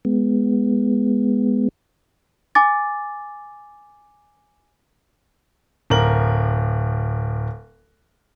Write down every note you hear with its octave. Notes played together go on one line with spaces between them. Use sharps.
G#3 B3
G#5 D6 A6
D1 A#4 F#7